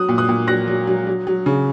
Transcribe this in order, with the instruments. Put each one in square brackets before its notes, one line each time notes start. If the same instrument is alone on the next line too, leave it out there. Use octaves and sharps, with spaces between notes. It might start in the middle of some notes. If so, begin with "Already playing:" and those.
Already playing: [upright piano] F#3 D#6 F#6
A#2
D#6 F#6
A#2
F#3 F#6 A#6
F#3
F#3
F#3
F#3
C#3